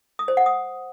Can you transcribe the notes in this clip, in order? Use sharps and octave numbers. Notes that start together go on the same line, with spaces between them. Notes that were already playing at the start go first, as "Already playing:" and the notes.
D#6
C5
F#5
D#6